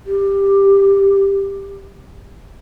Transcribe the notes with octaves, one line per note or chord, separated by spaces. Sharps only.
G4